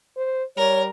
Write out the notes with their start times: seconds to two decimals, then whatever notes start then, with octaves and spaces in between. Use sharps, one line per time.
0.17 C5
0.57 G3 A#4 C#5